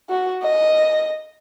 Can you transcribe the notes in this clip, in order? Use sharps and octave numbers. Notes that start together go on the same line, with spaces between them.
F#4
D#5